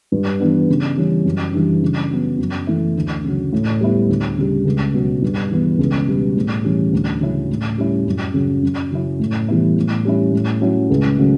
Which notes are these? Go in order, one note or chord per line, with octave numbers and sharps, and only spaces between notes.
G2
E3 B3 D4
C#3
E3 G3 C#4
F#2
E3 G3 D4
C#3
F#3 B3
F#2
E3 A3 E4
D2
C#3 F#3
A2
G3 B3 E4
D2
C#3 G3
C#2
B2 F#3
G2
E3 B3
C#2
B2 G3 B3
A2
E3 G3 C#4
D2
C#3 F#3 C#4 E4
A2
G3 C#4 E4
F#2
C#3 F#3
F#2
C#3 F#3 C#4 E4
A2
E3 G3 B3 E4
A2
G3 C#4 E4
A2
F#3 C#4 E4
C#2
C#3 F#3 A3